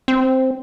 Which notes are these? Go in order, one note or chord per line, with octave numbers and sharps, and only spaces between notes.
C4